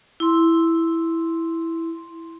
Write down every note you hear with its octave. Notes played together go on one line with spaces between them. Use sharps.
E4 C6